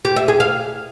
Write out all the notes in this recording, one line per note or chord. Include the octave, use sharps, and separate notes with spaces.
G4
E5
G#4
F5